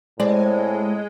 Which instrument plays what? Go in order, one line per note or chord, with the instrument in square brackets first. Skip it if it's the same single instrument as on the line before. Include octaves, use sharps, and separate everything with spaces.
[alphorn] A2 [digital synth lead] G#3 [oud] C4 D5